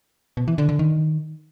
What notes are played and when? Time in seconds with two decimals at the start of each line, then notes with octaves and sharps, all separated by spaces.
0.37 B2
0.48 E3
0.58 D3
0.69 D3
0.79 D#3